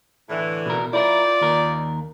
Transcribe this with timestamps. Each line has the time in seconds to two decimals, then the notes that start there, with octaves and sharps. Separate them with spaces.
0.28 A2 D3 E3
0.66 B2 A#4
0.93 E4 F4 A#4 C5 D5
1.41 D#2 A#4